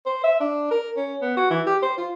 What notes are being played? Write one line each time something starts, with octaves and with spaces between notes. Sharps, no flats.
C5
E5
D4
A#4
C#4
B3
F#4
E3
G4
C5
F4